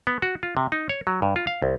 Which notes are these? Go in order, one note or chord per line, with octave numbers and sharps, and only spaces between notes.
B3
F#4
F4
C3
D#4
C#5
F#3
G2
F4
F5
C2